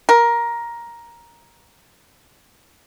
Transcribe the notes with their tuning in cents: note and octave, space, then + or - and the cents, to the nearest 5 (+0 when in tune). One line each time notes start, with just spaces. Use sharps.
A#4 +10